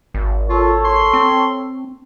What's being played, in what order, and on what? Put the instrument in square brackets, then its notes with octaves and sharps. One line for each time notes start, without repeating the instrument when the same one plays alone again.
[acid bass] G#1
[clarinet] F4 [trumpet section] A4 C#5
[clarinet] C6
[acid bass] C4